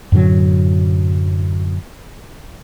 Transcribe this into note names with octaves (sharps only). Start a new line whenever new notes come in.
F#2 A2 D3 F#3